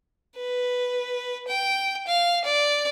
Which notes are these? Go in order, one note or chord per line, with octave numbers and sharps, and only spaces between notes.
B4
G5
F5
D5